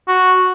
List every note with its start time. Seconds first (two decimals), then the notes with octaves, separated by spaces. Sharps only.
0.08 F#4